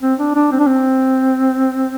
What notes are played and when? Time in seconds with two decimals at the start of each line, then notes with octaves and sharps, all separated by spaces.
0.03 C4
0.19 D4
0.35 D4
0.52 C4
0.59 D4
0.67 C4